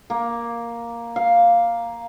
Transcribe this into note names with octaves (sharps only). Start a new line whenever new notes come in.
A#3
F5